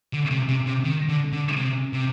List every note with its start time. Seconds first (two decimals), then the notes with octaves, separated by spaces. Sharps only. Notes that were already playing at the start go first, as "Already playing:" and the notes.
0.13 D3
0.31 C3
0.49 C3
0.67 C3
0.84 D#3
1.09 D3
1.33 D3
1.57 C3
1.93 C3